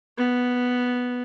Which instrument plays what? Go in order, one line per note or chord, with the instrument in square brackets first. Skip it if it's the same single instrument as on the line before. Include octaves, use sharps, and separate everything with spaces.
[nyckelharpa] B3